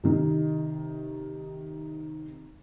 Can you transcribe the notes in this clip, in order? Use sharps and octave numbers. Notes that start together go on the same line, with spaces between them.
C3 D#3